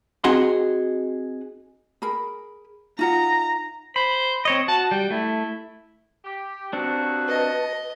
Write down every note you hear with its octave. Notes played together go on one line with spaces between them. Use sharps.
C4 D#4 F#4 G#4 F#5 C6
G#4 A#4 B5
D#4 F4 F#5 A#5
C5 B5
C4 C#5 D#5
F#4 A5
G3 G5
A3 E4
G4
D#2 B2 C4 D4 F#4
B4 D#5 A5